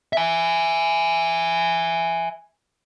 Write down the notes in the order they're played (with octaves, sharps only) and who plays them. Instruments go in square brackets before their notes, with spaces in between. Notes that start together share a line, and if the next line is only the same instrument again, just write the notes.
[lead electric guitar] E5 G#5